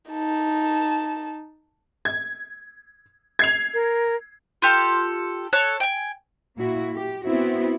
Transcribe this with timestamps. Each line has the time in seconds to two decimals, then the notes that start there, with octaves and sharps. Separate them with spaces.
0.11 D#4 A5
2.05 G#6
3.39 G#6 C7 F7
3.74 A#4
4.62 F4 G4 A4
5.53 A4 C#5 F#6
5.80 G5 G#5
6.58 A#2 A#3 E4 F#4
6.97 G4
7.25 B3 C4 E4 F#4